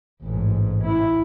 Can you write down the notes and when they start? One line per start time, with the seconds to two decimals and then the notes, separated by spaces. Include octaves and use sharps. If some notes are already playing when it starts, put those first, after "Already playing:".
0.22 A1 G#2
0.85 E4